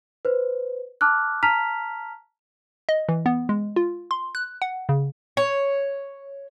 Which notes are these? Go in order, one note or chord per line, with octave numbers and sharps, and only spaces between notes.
B4 C5
A5 D6 F6 F#6
A5 A#5 F6 B6 F7
D#5
E3
B3
G#3
F4
C6
F#6
F#5
C#3
C#5